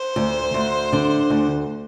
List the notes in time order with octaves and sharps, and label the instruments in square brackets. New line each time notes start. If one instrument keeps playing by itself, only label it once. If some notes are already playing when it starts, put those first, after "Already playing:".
Already playing: [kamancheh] C5
[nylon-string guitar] D2
D2
D3
D2